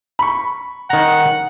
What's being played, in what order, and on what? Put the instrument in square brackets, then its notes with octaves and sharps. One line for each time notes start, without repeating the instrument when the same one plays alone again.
[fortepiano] B5 C#6
[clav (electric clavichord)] D#3 A#5 [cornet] F#5